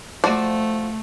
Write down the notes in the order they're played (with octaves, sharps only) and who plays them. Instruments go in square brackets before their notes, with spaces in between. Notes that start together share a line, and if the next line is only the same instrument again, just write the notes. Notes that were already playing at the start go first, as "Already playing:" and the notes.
[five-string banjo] F3 F#4 D5 [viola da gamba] A3